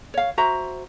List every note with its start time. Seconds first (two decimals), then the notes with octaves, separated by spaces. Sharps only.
0.14 C#5 F5
0.38 F#4 C5 E5 A#5